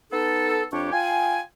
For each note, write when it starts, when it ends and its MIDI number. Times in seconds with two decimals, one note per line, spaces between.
0.12 0.64 59
0.12 0.64 63
0.12 0.64 69
0.73 0.92 41
0.73 0.92 62
0.73 0.92 67
0.73 0.92 73
0.73 0.92 85
0.93 1.40 65
0.93 1.40 79
0.93 1.40 80